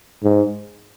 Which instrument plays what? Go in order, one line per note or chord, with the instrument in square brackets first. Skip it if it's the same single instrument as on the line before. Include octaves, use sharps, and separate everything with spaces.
[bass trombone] G#2